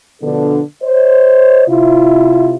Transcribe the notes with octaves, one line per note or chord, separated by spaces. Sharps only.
B2 D3 F3 B3 D4 A4
C5 C#5 D#5
C3 E4 F4